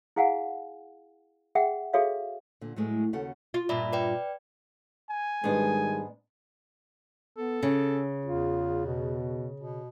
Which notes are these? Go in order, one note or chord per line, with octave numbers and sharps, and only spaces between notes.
E4 G#4 F5 F#5 G#5
G#4 E5 F#5 G5
F#4 G#4 A4 C#5 E5 F5
A#2 D3
A2 F#3 G#3 A3
D#2 C#3 F#4 A4 F#5
F4
G2 A#2 F4 D5 E5 B5
B4 D5 G5
G#5
G#2 D#3 G3 G#3 B3 D4
B3 A4
C#3 C#4
E2 F4
B2
B2